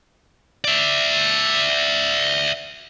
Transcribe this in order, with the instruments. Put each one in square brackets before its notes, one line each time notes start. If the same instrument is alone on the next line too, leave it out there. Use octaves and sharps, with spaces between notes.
[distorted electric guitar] D5 E5